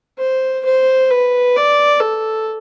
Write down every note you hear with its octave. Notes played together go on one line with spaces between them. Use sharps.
C5
C5
B4
D5
A4